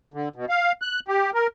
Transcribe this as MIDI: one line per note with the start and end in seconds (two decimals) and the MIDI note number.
0.14 0.29 50
0.36 0.45 47
0.49 0.72 77
0.82 1.00 90
1.08 1.31 67
1.34 1.47 70